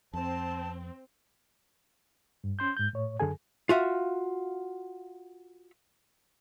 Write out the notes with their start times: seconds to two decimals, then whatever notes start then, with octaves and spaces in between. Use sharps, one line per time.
0.13 F2 C4 A5
2.44 G2
2.59 C#4 C6 G6
2.77 G#2 G6
2.93 A2 C#5
3.20 F#2 D3 G#4 A4 G#5
3.69 F4 F#4 E5 F5